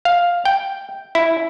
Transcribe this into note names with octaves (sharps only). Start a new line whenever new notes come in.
F5
G5
E4